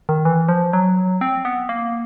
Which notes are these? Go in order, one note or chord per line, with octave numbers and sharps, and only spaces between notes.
D#3
E3
F3
F#3
C4
B3
A#3